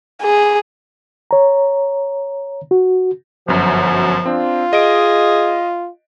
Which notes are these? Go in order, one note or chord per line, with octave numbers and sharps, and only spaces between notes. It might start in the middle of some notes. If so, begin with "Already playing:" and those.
G#4
C#5 A#5
F#4
G1 F#2 F3 F#3
C4 D4 F4
G#4 D#5 D7